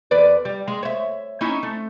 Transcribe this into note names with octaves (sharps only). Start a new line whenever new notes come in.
E2 B4 D5
G3
G#3
C#5 E5
C#4 D#4 E4
A3